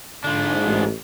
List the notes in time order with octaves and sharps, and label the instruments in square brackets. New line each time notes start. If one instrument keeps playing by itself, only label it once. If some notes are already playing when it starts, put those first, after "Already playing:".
[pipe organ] G#2 [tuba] D3 [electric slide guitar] D4 F4
[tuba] A1